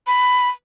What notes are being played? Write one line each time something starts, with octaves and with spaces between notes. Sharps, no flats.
B5